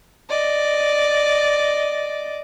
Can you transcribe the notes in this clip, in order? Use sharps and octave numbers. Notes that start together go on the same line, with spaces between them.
D5 D#5